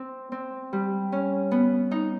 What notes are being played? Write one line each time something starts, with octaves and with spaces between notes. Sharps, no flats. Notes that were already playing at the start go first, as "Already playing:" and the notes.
Already playing: C4
C4
G3
C#4
B3
D#4